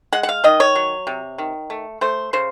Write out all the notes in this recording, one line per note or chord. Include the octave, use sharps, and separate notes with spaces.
G#3 F#5
F#5
F5
D#3 D#5
C#5
F#3
C3
D#3
A3
A3 C5
C#3 C5